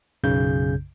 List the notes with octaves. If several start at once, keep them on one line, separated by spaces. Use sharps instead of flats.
B1 F#2 C#3 G6